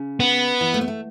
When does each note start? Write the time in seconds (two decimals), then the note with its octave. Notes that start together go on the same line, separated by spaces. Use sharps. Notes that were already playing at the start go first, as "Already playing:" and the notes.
Already playing: C#3
0.20 B3
0.61 E3
0.74 A3
0.81 B3
0.88 A3